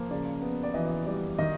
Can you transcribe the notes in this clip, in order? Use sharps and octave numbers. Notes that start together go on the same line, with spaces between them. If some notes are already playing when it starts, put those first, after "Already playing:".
Already playing: F3 A#3
C#3 D5
B3
D5
E3 D#5
G3 D5
D#3 D#5